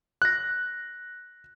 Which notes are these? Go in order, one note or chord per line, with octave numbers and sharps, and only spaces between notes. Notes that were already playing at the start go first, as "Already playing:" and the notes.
F#6 A#6